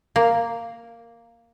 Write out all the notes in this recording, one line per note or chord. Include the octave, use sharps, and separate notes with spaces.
A#3